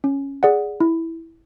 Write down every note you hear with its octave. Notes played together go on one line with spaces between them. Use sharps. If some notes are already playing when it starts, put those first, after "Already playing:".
C#4
G#4 D5 F#5
E4